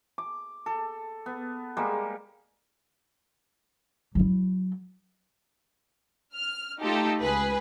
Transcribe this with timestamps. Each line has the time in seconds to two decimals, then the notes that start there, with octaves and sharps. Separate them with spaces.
0.18 D6
0.66 A4
1.26 B3
1.77 G3 G#3 A#3
4.15 F#3 E4
6.34 F6
6.81 A3 D#4 F4 G4 A4
7.21 C#2 G#4 B4